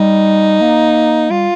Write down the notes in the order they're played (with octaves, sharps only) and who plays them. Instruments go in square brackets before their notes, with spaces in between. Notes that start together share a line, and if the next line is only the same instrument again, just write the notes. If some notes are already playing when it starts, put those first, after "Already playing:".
Already playing: [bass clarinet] G3 [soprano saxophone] D#4
[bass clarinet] A#3
[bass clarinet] G3 [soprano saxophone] F4